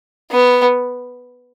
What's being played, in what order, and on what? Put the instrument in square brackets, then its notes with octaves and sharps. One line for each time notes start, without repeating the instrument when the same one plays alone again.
[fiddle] B3